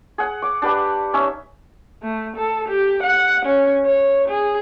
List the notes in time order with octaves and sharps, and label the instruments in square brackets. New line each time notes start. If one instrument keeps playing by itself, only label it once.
[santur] G#4 F#5
D6
D4 G4 B4 F#5
C#4 D#4 E5
[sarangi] A3
A4
G4
F#5
C#4
C#5
G#4